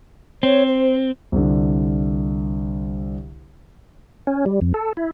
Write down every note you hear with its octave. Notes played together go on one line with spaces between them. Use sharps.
C4 C#5
C5
C2 D3
C#4
G3
F2
A4
E4